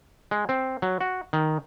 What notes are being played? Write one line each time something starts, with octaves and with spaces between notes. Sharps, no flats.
G#3
C4
F#3
F#4
D#3